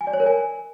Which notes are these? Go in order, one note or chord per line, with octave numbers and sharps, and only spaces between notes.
G#5
D5
C#5
A#4
G#5